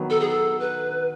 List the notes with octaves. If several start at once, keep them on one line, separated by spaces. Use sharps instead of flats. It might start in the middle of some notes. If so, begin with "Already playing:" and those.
Already playing: D#3 F#3 B3
A4
G#4
A4
B4